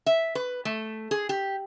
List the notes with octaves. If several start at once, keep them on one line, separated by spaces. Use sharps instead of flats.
E5
B4
A3
G#4
G4